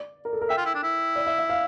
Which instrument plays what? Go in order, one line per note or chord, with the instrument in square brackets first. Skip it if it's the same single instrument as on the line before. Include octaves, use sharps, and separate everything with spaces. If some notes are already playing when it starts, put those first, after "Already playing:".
Already playing: [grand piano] D5
A#4
A4
A#4
[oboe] E5 [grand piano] G5
[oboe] F4
E4
D4
E4
[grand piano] D5
E5
E5
F5